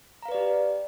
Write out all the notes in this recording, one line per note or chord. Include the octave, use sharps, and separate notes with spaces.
G4 B4 D5 F5 A#5